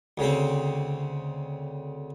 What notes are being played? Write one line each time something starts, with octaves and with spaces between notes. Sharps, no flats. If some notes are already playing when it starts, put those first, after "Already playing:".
D2 C#3 C4